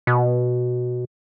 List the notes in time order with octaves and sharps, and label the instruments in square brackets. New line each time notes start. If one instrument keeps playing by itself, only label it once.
[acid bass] B2